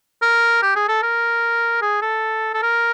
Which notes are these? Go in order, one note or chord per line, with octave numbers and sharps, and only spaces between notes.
A#4
G4
G#4
A4
A#4
G#4
A4
A4
A#4